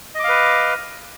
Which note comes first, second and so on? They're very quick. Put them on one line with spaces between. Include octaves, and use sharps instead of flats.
D#5 D6 F5 B4